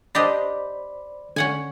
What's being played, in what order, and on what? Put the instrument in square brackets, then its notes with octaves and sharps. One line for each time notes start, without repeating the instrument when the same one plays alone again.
[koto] D4 G4 D#5 [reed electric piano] C5 D5 B5
[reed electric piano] D3 [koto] C#4 F#5 G#5